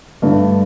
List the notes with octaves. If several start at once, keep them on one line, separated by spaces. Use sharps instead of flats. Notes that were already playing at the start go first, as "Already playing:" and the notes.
G2 D3 A3